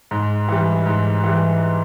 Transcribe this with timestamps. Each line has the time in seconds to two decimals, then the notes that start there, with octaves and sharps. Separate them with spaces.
0.11 G#2
0.48 E3 G3
0.86 G#2
1.24 E3 G3